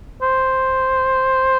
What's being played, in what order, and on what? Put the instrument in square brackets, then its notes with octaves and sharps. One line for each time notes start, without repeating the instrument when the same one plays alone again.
[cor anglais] C5